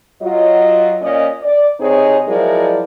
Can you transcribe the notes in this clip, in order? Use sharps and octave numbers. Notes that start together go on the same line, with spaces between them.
F#3 F4 D#5
A#2 C#4 D5 D#5
D5
C3 C4 D#4 G#4 C#5
F3 F#3 G#3 E4 A#4 D5